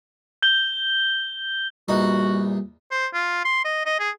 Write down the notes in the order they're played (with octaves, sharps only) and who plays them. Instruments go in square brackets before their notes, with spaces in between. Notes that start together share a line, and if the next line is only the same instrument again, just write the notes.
[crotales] G6 G7
[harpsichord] A#1 E2 D#4 [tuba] G3 [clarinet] F#4
[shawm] C5
F4
C6
D#5
D#5
G#4